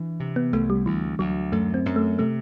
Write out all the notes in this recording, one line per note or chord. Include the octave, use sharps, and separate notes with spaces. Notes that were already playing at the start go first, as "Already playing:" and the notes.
Already playing: E3 D4
C3
B3
C2 A3
G3
D2 E3
D2 F#3
F#2 A3
C4
F#2
A3
C3 A3